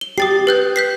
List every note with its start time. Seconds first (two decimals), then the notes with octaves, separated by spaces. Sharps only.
0.01 G7
0.18 G4 D#6 A6 C7
0.47 B4 F#6 G6
0.76 G6 B6 C7